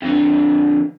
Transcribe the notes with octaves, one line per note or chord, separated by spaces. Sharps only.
F2 D3